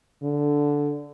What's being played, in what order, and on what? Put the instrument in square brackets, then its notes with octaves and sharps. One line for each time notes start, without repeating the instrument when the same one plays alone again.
[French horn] D3